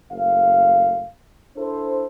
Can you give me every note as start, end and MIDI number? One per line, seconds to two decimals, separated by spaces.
0.11 1.07 30
0.11 1.07 57
0.11 1.07 77
1.56 2.04 62
1.56 2.04 64
1.56 2.04 69
1.56 2.04 72